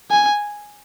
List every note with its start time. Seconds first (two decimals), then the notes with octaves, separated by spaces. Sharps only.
0.11 G#5